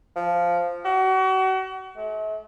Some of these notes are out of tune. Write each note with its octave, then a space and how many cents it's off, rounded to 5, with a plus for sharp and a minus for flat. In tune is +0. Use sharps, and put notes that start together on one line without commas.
F3 -5
F#4 +35
A3 -45